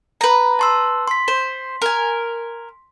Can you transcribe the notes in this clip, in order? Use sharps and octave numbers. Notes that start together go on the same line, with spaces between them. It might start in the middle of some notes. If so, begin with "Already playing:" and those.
B4 A#5
A5 C6 E6
C6 B6
C5
A#4 G#5